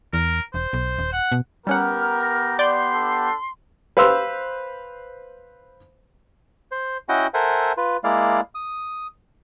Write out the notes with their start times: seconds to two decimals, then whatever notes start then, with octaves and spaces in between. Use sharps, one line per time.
0.13 E2 A#4
0.54 E1 C5
0.73 B1
0.98 D#1
1.13 F#5
1.32 B2
1.67 G3 B3 C#4 G4 A#4 F#5 F6
2.21 A#6
2.59 D5 C6 G6
2.94 D4 A4
3.97 B4 C5 F5 C6 E6
6.71 C5
7.09 C#4 E4 F#4 D#5 F#5 G5
7.34 A4 A#4 C5 E5 F#5 G#5
7.77 F4 B4
8.04 G#3 A#3 E4 D5 F5
8.55 D#6